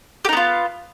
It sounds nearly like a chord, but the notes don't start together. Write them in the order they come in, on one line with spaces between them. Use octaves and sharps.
G4 D#4 B3 F4